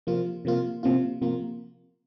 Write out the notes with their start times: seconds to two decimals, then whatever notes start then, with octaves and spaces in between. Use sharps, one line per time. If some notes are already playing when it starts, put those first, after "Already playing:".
0.07 C3 F3 A#3 F4
0.45 C3 F3 A#3 F4
0.83 C3 F3 A#3 F4
1.22 C3 F3 A#3 F4